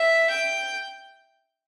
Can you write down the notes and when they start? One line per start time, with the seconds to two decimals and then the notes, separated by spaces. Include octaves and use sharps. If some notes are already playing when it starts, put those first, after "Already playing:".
Already playing: E5
0.30 G5